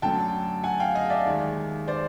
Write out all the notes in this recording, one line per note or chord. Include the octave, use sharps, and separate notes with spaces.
F#2 D3 F#3 A3 G5 A5
F#5 G#5
F5 G5
D#5 F5
D5 E5
D#2 D#3 G#3
C5 D5